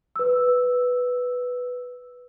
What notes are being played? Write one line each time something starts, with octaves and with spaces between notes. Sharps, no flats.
B4 E6